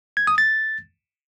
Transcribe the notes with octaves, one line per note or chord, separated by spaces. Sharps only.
G#6
D#6
A6